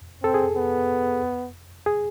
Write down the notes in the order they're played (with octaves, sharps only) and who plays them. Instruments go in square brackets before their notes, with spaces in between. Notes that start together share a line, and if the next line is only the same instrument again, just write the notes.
[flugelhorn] C4 [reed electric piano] A4
[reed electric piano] G#4
[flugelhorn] B3
[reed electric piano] G#4